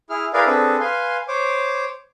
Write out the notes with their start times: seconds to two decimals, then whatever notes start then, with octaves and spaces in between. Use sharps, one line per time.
0.10 E4 G#4 F6
0.33 E4 G#4 A#4 B4 D5 F5
0.46 C4 D4 G#4 A4 B4
0.80 B4 F5 G#5 C6
1.28 C5 C#5 D6